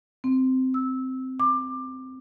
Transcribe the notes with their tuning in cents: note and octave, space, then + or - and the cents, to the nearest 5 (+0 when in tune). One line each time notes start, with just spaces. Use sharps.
C4 -10
E6 -20
D6 +15